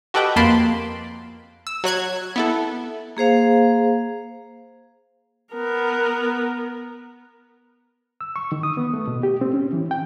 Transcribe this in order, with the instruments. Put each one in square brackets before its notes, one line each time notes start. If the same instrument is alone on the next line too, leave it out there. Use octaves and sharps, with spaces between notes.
[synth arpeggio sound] F#4 G4 A4 B4 D#5 G5
F2 A#3 A5 B5 C6 D7
E6
F#3 C#5 F#6 G#6
B3 E4 A4
[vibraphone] A#3 G#4 C5 F5
[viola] B3 A#4
[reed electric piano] E6
C#6
D#3
D#6
B3
A3
B2
G4
C4
C#4
E3
G5